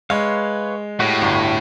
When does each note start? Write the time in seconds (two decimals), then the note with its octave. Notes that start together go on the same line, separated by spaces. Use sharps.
0.10 G#3 B4 C#5 F5
1.00 A2 F#4 G4
1.21 G1 D2